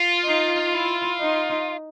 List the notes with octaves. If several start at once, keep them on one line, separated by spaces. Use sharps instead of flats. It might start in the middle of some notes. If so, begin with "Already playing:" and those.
Already playing: F4
D#4
E4
D#4